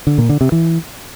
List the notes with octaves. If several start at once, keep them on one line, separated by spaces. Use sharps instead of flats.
D3
A#2
D3
C3
E3